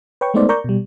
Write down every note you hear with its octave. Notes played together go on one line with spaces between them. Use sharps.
B4 C#5 G5 C#6
G#3 A3 B3 D#4 C5 D5
A#4 D5 A#5 C#6 G6
B2 G3